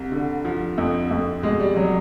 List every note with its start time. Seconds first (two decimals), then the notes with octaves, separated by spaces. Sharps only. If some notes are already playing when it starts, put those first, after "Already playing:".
Already playing: C2
0.12 D3
0.45 F3
0.78 F2
1.11 F2
1.43 B2 G#3
1.60 G3
1.76 F#3